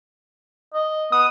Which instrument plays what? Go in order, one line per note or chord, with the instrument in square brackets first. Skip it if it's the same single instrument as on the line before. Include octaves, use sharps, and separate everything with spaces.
[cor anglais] D#5
[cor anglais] B3 [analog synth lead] D#6